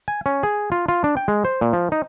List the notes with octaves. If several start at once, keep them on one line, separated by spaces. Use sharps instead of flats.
G#5
C#4
G#4
F4
F4
D4
G5
G#3
C5
A#2
F3
D#4